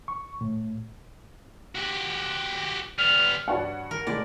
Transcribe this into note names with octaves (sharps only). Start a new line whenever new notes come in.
C#6
A2
F#4 G4
G3 B3 F6
G2 F#4 C#5 D5 F#5
A#4
B1 A2 G#3 D5